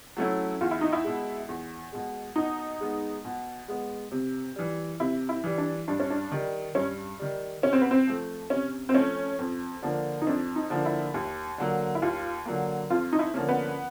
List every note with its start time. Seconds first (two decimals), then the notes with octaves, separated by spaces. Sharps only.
0.17 F#3 A3 C#4 E4
0.61 E2 F4
0.71 E4
0.81 D#4
0.93 E4
1.04 B2 G#3
1.49 E2
1.92 B2 G#3
2.36 B2 D#4
2.81 G#3 B3
3.25 B2
3.68 G#3 B3
4.12 C3
4.56 E3 G3
5.00 C3 E4
5.29 E4
5.44 E3 G3
5.58 D4
5.88 G2 D4
6.00 C#4
6.10 D4
6.31 D#3 G3
6.75 G2 C#4
7.19 D#3 G3
7.62 C3 C#4
7.73 C4
7.82 B3
7.91 C4
8.07 F3 A3
8.50 C3 C#4
8.89 C4
8.94 F3 A3 C#4
9.39 F2
9.82 D3 F3 A#3 D4
10.22 D#4
10.27 F2 D4
10.56 D#4
10.70 D3 F3 A#3 D4
10.86 E4
11.14 D#2
11.58 D3 F#3 A#3
11.95 E4
12.02 D#2 F4
12.46 D3 F#3 A#3
12.90 F2 F4
13.13 D#4
13.19 E4
13.34 D3 F3 A#3 C#4
13.49 B3